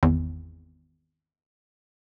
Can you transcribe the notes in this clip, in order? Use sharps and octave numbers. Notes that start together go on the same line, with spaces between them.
G#1 E2